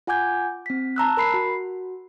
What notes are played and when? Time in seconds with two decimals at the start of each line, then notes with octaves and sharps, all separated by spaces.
0.07 F4 F#5 G#5 D6 G6 G#6
0.66 C4 B6
0.96 A5 A#5 E6 F#6
1.17 A#4 B5 C7
1.34 F#4